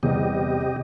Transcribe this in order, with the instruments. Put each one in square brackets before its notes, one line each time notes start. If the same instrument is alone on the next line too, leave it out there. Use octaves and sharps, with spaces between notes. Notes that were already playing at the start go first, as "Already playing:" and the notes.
[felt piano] E2 G3 B3 [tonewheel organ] C3 G4 D#5